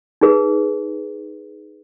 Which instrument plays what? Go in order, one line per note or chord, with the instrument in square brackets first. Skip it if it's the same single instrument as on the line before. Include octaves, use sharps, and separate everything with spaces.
[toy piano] D#4 G#4 B4